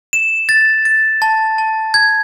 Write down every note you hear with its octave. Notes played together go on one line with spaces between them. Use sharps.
E7
A6
A6
A5
A5
G#6